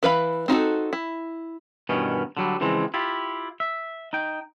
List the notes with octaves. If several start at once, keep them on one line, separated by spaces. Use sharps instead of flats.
E3 B4 F5 B5
C4 D#4 F#4 A4
E4
G2 B2 D#3 E3 B3 C#4
D3 F#3 G3
C#3 E3 F3 G#3 C4
E4 F4 G4
E5
D#4 G5